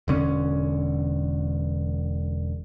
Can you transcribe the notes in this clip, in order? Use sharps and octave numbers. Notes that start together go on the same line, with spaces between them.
E1 D3 C#4